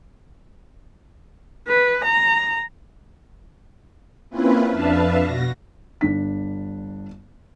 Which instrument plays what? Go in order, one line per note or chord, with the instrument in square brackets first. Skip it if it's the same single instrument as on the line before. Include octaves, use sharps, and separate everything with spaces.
[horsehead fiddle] B4
A#5
[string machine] A#3 C4 C#4 E4 F4 B4
F2 D4 B4 E5 F5 A5
B2 F#4 A#6
[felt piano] G1 D4 B6